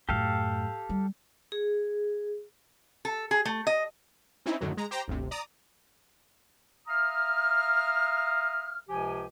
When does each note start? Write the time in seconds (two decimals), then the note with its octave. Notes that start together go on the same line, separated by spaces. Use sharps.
0.09 F#2 A2 G4 A4 F5
0.89 G3
1.52 G#4
3.05 A4
3.31 G#4
3.45 A3
3.67 D#5
4.46 C4 C#4 D#4 E4
4.61 F#2 A2 D3 D#3 F#3
4.77 G#3 A#5
4.91 G4 C5 G5 A#5
5.08 G1 D2 C3
5.31 D5 A#5 D#6
6.87 E5 F5 A#5 D#6 F6
8.89 C#2 C3 F3 G4 G#5